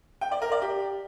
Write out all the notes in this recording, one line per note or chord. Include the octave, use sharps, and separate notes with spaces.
G5
D5
A#4
D5
G4